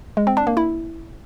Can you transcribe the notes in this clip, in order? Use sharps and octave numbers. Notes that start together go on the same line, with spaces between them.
G#3
C4
D4
A#3
E4